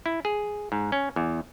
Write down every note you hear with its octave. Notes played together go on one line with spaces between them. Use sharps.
E4
G#4
G#2
C#4
E2